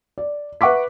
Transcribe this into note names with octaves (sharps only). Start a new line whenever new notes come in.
D5
B4 E5 F#5 C#6 D6 B6